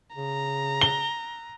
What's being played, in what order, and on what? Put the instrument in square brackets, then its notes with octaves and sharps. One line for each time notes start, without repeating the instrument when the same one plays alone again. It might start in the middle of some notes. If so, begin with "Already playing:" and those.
[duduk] C#3 [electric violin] A#5
[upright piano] G7